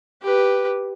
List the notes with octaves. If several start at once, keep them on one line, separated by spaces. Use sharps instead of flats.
G4 B4